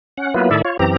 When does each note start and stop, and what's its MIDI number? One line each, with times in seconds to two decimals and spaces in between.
0.18 0.34 61
0.18 0.34 78
0.34 0.50 54
0.34 0.50 58
0.34 0.50 59
0.34 0.50 64
0.34 0.50 65
0.34 0.50 71
0.51 0.62 45
0.51 0.62 51
0.51 0.62 64
0.51 0.62 69
0.51 0.62 74
0.51 0.62 76
0.65 0.77 65
0.65 0.77 73
0.79 0.97 42
0.79 0.97 52
0.79 0.97 60
0.79 0.97 67
0.79 0.97 82